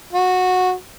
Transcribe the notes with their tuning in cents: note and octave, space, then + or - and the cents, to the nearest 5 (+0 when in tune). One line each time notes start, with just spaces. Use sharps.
F#4 -15